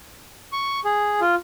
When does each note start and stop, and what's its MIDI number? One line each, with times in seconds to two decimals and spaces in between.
0.52 0.80 85
0.85 1.20 68
1.21 1.35 65